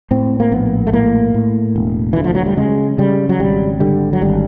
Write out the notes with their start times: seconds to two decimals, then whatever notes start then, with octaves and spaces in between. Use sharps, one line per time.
0.11 A2 C4
0.40 A#3
0.52 A#1 B3
0.87 A3
0.93 A2 A#3
1.34 A2
1.76 E1
2.13 D2 E3
2.24 F3
2.35 F#3
2.46 G3
2.57 C#3 G#3
2.98 C#3 G3
3.29 F#3
3.39 G#1 G3
3.80 D3 G3
4.13 F#3
4.21 G#1 G3